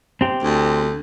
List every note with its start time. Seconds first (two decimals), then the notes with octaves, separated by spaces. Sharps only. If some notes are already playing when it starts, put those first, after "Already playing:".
0.21 C4 G4
0.43 D2